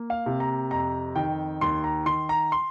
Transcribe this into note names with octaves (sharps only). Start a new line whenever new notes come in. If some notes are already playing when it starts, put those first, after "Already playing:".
Already playing: A#3
F5
C3
A#5
F2 A#5
D#3 G5
D#2 C6
A#5
D#3 C6
A#5
C6